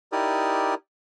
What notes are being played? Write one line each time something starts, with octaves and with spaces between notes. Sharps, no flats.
D#4 E4 G4 A#4 D5 D#6